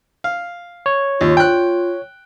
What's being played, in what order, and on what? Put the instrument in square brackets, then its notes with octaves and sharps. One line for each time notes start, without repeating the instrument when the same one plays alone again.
[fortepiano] F5
[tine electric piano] C#5
[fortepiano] D#2 [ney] F4
[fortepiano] G5 F#6